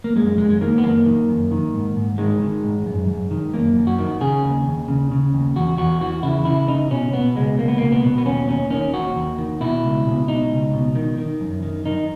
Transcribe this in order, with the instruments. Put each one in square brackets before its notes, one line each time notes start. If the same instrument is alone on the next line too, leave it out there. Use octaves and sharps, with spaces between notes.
[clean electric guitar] A#3
F#2 G#3
F#2 G#3
G#3
D#3 A#3
B3
F#2 A#3
D#3
F#2
D#3
G#2
G#2
D#3 G#3
D#3
G#2
F#2
F#2
D#3
F#2 A#3
F#2
F#4
D#3
C#3 G#4
D#2
D#2
C#3
C#3
D#2
E2 F#4
E2 F#4
E3 F#4
C#3 E4
C#3 E4
C#3 D#4
B2 C#4
B2 B3
C#2 G#3
C#2 A#3
B3
B2 A#3
B3
B2
B3
D#2 C#4
D#2 C#4
D#3 C#4
D#2 F#4
D#2
D#3
B2 E4
C#2
B2
B2 D#4
C#2
B2
D#3
D#3
F#2
D#3
D#3 D#4